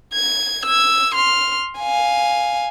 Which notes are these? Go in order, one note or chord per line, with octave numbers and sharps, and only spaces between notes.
G#6
E6 G#6
C6 F6
F5 G#5